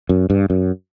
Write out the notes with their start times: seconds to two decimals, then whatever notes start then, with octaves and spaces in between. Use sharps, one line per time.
0.09 F#2
0.30 G2
0.50 F#2